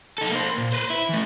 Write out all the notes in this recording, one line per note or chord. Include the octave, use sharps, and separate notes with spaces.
D#4 A4
A#3 C5
A#2
B4 C5
E4
E3 A3